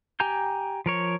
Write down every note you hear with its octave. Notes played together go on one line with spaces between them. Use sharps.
G4 G5 G#5 A#5 G6
F3 A#4 C#5